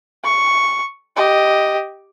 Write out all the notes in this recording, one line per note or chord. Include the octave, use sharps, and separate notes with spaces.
C#6
G4 D#5